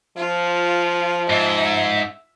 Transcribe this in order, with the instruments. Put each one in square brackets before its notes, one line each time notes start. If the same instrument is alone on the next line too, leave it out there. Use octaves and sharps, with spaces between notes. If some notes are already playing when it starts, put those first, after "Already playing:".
[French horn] F3 [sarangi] F4
[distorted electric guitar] G#2 [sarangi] E5